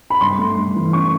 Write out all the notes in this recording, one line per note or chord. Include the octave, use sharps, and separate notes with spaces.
B5
G2 C6
A3
G2
E3
C#4 C#6